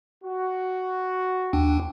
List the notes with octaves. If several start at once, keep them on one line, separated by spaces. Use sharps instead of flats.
F#4
D#2 D4 G5